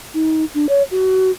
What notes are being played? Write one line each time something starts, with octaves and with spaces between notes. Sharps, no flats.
D#4
D4
C#5
F#4